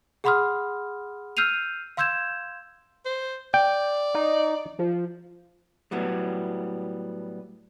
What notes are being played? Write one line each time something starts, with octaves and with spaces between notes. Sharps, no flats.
G#4 F#5 B5 C6 D#6 F6
E6 F6 G6 C7 D#7 F7
F5 C6 E6 G6 G#6 E7
C5
D5 G5
D#4
F3
A2 F#3 G3 B3